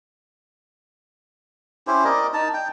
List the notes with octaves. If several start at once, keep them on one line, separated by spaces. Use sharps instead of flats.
C#4 E4 G4 C5
A#4 D5 D#5
D#4 A5
G5